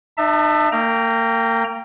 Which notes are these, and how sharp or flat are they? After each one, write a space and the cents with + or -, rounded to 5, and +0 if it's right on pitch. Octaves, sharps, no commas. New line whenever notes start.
D#4 -40 E5 +0 A5 +25
A#3 -35 G5 +0 A#5 +0